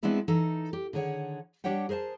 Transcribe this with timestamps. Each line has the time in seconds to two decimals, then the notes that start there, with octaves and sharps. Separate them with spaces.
0.03 G#3 B3 C4 D4 E4 G#4
0.28 E3 D#4 A4
0.73 G4
0.93 D3 D#3 G#4 C#5 F#5
1.64 G3 D4 G4 C#5 F#5 G5
1.89 G#4 A#4 C5 F5 A5